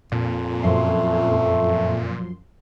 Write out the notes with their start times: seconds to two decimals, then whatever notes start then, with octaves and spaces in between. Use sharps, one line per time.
0.12 F2 A#2
0.63 F#2 F3 A3 C6